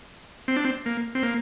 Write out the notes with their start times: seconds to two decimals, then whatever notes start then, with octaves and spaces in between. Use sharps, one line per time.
0.48 C4
0.56 D4
0.64 C4
0.86 A#3
1.15 C4
1.23 A#3